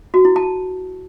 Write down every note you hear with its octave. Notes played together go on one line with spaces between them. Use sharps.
F#4
E4
A5